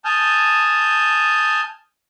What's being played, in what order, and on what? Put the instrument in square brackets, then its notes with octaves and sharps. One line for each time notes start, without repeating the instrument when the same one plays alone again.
[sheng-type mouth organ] G#5 A5 D#6 F6 G6